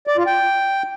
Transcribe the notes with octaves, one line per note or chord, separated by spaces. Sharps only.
D5
F4
G5